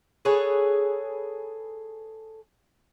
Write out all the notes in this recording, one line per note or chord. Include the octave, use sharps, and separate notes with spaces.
G#4 A4 B4 C#5